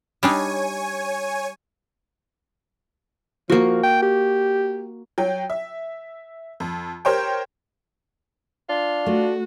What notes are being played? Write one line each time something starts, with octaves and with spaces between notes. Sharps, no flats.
G3 D4 D#4 C#5 G#5
F3 A#3 F#4
G5
G4
F#3 G5
E5
F2
G4 A#4 C5 C#5 G5
D4 F4
A3 F#4